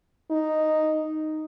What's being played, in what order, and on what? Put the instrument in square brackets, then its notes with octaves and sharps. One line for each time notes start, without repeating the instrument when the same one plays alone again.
[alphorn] D#4